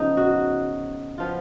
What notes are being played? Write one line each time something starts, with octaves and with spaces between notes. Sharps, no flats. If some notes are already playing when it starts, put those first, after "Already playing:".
Already playing: C#3 F3 B3 D#4
F#4
F3 B3 F4